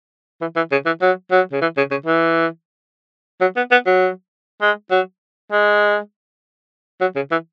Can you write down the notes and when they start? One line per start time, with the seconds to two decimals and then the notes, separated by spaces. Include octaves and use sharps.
0.41 E3
0.56 E3
0.72 C#3
0.86 E3
1.02 F#3
1.32 F#3
1.52 C#3
1.61 E3
1.77 C#3
1.91 C#3
2.06 E3
3.41 F#3
3.57 B3
3.72 B3
3.86 F#3
4.62 G#3
4.91 F#3
5.52 G#3
7.01 F#3
7.16 C#3
7.31 E3